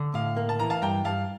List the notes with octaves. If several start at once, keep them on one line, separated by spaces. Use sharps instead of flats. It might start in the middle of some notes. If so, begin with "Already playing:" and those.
Already playing: D3
A2 F5
A#3
A5
E3 A#5
F5 A5
G2 G5 A#5
G2 F5 A5